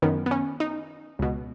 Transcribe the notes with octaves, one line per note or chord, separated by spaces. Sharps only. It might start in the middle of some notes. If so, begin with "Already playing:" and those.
F#2 D#3 B3
B3
C#4
D#4
C#2 B2